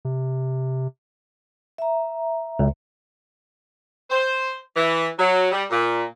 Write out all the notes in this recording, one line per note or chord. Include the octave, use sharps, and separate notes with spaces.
C3
E5 A#5
C#2
C5
E3
F#3
G3
A#2